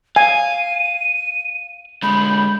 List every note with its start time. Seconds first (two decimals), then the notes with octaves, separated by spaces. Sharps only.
0.16 F5 G#5 D#7
2.03 D3 G#3 B5 G6